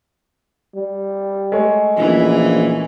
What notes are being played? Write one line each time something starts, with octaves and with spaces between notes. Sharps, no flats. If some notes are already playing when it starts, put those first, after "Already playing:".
G3
G#3 A3 C#5
A#1 E3 C#4